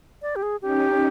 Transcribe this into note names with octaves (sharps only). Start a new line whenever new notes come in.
D5
G4
G#4
C#4 D#4 G4